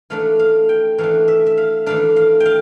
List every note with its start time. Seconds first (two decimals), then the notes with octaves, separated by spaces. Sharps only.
0.10 E3 A3 D4 F5
0.39 F5
0.69 G5
0.98 E3 A3 D4 F5
1.28 E5
1.46 E5
1.57 F5
1.86 E3 A3 D4 F5
2.16 F5
2.40 G5
2.45 F5